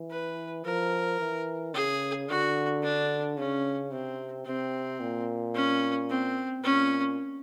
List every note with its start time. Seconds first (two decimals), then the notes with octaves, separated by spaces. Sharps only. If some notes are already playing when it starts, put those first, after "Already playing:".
Already playing: E3
0.11 B4
0.65 F3 A#4
1.20 E3
1.74 C#3 G#4
2.28 D3 F#4
2.83 D4
3.37 C#3 C#4
3.91 C3 C4
4.46 C3 C4
5.00 A#2
5.55 C#4
6.10 C4
6.64 A#2 C#4